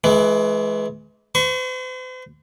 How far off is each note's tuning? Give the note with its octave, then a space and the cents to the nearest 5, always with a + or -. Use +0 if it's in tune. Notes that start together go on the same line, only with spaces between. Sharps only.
E3 +5 G#3 +35
C5 -45 C#6 +10